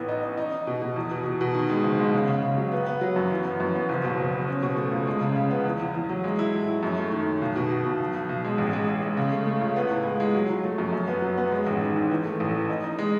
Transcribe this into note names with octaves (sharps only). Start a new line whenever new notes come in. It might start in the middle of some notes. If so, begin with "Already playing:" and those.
Already playing: A1 A2 B3
D#4
D#4
D#4
D#4
B2
B2
E2
B2
B2
B2
D#3
G#3
F#1
G#3
C#3
C#3
C#3
F#3
B3
B3
F#3
F#2
E3
B3
F#2
B3
F#1
B2
F#1
F#1
C#4
B2
A3
C#2
G#3
C#3
C#3
B3
E2
E2
E2
F#3
G#3
E4
A2
E4
F#2
A3
D#3
D#3
B1
B2
B2
B2
B1
B1
B1
G#3
A1
G#3
G#3
G#3
C#3
A3
A3
C#2
B3
A2
G#3
G#3
F#3
F#3
A3
F#2
F#2
B3
F#3
B3
G#3
A1
D#3
G#2
E3
A3
A1
E3
D#4
D#4
G#3